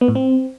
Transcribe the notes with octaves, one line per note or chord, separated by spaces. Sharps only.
B3
A2
C4